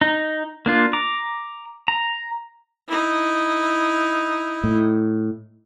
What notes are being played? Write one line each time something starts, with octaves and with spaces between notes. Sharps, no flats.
D#4
A#3 D4 F4
A#5 D6
A#5
D#4 E4
A2